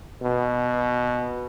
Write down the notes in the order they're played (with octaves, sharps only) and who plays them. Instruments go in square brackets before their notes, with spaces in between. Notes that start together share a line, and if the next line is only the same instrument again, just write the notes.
[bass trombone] B2